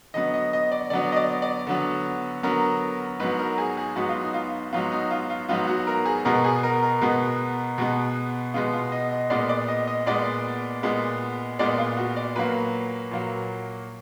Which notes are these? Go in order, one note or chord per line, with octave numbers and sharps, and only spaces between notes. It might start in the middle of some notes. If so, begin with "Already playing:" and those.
D3 F#3 B3 D#5
D#5
D#5
D5
D3 F#3 B3 D5
D#5
D5
D5
D3 F#3 B3
D3 F#3 B3 A#4
G#2 F#3 B3 B4
A#4
G#4
G#4
G#2 F#3 B3 F#4
F4
D#4
F4
G#2 F#3 B3 F4
D#4
F4
F4
G#2 F#3 B3 F4
F#4
A#4
G#4
B2 G#3 B3 A#4
G#4
A#4
A#4
B2 G#3 B3
B2 G#3 B3
B2 G#3 B3 F4
F4
D#5
D#5
A#2 G#3 B3 D5
D5
D#5
D#5
A#2 G#3 B3 D5
A#2 G#3 B3
A#2 G#3 B3 D5
F4
F#4
D5
A#2 F#3 A#3 B4
A#2 F#3 A#3